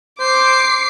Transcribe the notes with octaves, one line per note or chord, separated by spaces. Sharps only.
C5 D6 C7